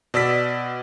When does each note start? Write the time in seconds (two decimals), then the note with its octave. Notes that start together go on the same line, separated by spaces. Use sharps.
0.14 B2 D5 E6 B6